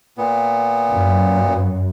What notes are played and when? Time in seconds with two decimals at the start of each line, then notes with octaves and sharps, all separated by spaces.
0.18 A#2 B3
0.91 F#2